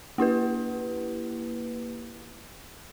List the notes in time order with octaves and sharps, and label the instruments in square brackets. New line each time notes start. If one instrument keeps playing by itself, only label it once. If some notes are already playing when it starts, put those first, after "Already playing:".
[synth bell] A#3 E4 G4 B4